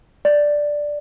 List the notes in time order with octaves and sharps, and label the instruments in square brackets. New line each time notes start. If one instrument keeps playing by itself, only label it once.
[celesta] D5